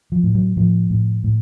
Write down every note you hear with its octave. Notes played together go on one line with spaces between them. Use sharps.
F3
A2
F#3
A2 F3
A2
A2